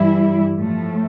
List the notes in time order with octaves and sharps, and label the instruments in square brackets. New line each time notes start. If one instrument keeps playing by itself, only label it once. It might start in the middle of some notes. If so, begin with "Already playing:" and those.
Already playing: [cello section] G2 E3 G3 E4
A2 F3 A3